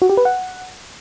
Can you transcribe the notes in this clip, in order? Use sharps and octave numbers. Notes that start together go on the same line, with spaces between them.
F#4
G4
B4
F#5